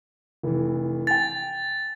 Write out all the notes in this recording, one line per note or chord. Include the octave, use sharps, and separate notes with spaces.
F1 E3
G5 G#5 A6